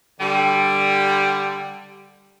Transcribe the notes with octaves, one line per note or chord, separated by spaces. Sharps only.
D3 G3